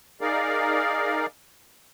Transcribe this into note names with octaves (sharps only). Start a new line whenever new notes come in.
D#4 G#4 A#4 D5 F5